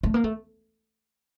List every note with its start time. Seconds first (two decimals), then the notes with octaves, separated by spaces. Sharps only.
0.03 A3
0.14 A#3
0.24 A3